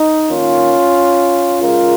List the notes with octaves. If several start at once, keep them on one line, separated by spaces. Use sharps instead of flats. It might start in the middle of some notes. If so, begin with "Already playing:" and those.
Already playing: D#4
D#3 A#3 C#4 F4
C#3 G#3 F4 A#4